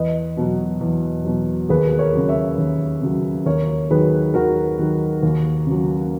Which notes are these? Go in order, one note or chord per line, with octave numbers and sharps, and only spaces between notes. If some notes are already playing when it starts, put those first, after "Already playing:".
Already playing: E2 B4 D#5
B2 F#3
E2
B2 F#3
D#2 G#4 B4
A#4 C#5
C#3 F#3
C#5 E5
D#2
C#3 F#3
D#2 A#4 C#5
D#3 F#3 G#4 B4
D#2 F#4 A#4
D#3 F#3
D#2
C#3 F#3